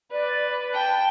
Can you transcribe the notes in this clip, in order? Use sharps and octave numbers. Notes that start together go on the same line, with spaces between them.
B4 D5
G5 A5